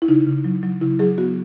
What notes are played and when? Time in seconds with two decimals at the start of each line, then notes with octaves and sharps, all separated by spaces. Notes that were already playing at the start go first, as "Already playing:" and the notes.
0.02 E4
0.08 C#3 D#4
0.27 C#3
0.45 F#3
0.63 F#3
0.81 C#3 E4
0.99 F#3 G#4
1.18 B3 F#4